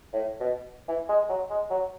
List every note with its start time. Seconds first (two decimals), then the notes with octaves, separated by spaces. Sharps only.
0.13 A2
0.40 B2
0.88 E3
1.09 G#3
1.29 F#3
1.50 G#3
1.70 F#3